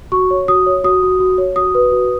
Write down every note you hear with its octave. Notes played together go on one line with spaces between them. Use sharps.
F#4 C#6
C#5
F#4 D#6
C#5
F#4 D#6
F#4
F#4
C#5
F#4 D#6
B4
F#4